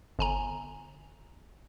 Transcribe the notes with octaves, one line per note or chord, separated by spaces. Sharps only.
G1 G#5 A#5